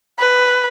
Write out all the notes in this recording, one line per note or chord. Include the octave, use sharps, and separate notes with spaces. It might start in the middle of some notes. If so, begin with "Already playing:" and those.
B4